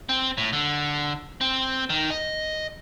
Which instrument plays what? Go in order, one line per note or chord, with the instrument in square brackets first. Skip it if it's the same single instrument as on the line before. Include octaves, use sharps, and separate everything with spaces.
[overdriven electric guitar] C4
A2
D3
C4
D#3
D#5